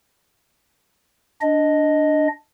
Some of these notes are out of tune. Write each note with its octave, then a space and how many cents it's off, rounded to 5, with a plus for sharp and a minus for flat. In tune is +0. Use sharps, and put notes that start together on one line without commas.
D4 +0 D#5 +0